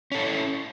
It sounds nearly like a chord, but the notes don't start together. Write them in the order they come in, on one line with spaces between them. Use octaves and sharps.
C#4 A4 E4